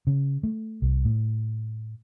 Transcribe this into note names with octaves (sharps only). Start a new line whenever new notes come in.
C#3
A3
C2
A2